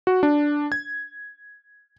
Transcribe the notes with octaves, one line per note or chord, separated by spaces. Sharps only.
F#4
D4
G#6